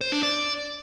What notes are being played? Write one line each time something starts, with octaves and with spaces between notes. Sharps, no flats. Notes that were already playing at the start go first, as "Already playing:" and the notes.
C5
D4
D5